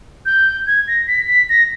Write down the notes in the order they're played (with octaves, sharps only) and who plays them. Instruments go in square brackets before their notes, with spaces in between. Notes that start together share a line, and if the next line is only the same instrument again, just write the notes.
[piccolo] G6
G#6
A#6
B6
B6
A#6